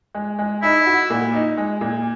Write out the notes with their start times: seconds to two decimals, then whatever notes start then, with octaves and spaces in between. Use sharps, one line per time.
0.15 G#3
0.39 G#3
0.62 D#4 E4
0.86 F#4
1.10 A#2
1.33 D#4
1.57 G#3
1.81 A#2